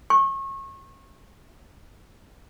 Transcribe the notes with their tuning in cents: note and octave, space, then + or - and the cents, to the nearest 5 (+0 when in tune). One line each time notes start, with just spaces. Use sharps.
C#6 -30